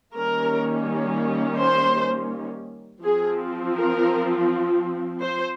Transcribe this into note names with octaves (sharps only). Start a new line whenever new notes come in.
D#3 G3 A#3 C#4 A#4
C5
F3 C4 G#4
A#4
C5